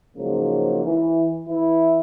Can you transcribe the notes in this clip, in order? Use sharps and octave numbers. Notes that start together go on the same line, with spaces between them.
G#2 C#3 F3 F#3 A#3
E3
E3 E4